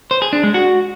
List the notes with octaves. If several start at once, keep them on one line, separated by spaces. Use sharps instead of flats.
C5
G#4
D4
G#3
F#4